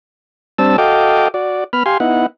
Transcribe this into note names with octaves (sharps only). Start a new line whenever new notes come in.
G3 C4 D4 A5 E6
F#4 A4 D#5 F5 G5 D6
F#4 D5
B3 B5 F6
G4 F5 G#5 C6
B3 D#4 E4 F#5